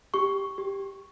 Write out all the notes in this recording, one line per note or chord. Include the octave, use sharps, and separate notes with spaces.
G4 C#6
G4